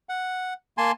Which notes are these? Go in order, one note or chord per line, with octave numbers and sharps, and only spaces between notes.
F#5
A#3 G#5 A5 C6